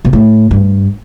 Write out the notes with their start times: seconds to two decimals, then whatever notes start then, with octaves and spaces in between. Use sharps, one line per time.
0.05 B2
0.13 A2
0.51 G2